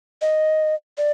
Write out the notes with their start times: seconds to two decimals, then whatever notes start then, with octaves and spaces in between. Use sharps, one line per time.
0.22 D#5
0.98 D5